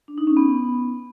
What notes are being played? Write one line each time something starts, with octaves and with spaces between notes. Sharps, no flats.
D4
D#4
C#4
B3